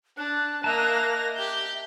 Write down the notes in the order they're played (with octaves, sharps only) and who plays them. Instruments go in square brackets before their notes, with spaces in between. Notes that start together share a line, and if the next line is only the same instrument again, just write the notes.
[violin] D4 [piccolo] F#6
[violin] A#3 A#6 [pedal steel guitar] D#5 E5 A5
[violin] G4 G6